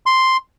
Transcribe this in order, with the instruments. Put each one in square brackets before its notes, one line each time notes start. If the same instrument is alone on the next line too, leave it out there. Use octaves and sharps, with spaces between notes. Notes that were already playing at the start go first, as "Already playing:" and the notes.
[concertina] C6